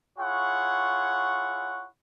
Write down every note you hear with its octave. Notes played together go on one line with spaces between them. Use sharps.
E4 F4 G#4 C#5 F#5 C#6